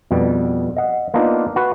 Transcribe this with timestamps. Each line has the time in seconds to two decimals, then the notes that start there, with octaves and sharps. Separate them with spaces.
0.11 F2 B2 G3
0.77 D#5 F#5
1.14 A#3 B3 D4 D#4 F4
1.56 F#4 B4